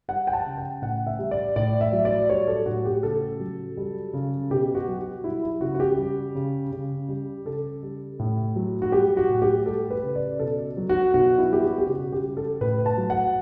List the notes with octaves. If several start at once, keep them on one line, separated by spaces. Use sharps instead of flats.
G3 F#5
G5
A5
C#3
G5
A2 F#5
E5
G3
D5
A2 D5
E5
F#3
D5
G3 C#5
A4
A2 F#4
G4
C#3 A4
F#3
G3
C#3
B2 G4
F#4
F#3
F#4
G3 E4
E4
C#3 F#4
F#4
G4
G3
C#3
C#3
G3
C#3 A4
G3
A2
F#3
F#4
G3 G4
F#4
A2
G4
G3 A4
B4
C#3
D5
B2 A4
F#3
F#4
B2 F#4
E4
G3 G4
F#4
G4
C#3 F#4
G4
G3
A4
A2 B4
A5
F#3
F#5